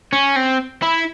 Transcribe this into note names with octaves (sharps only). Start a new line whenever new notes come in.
C#4
C4
E4